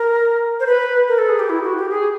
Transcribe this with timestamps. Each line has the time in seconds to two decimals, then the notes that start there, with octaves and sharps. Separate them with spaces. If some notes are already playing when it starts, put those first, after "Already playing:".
Already playing: A#4
0.60 C5
0.66 B4
1.08 A#4
1.18 A4
1.29 G#4
1.39 G4
1.49 E4
1.63 F#4
1.77 G4
1.90 G#4